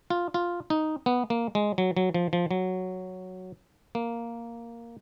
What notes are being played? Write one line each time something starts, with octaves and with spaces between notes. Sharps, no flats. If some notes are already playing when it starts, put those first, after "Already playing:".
F4
F4
D#4
B3
A#3
G#3
F#3
F#3
F3
F3
F#3
A#3